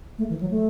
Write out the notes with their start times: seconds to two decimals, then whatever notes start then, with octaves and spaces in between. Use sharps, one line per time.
0.18 A3
0.30 E3
0.40 F#3
0.51 A3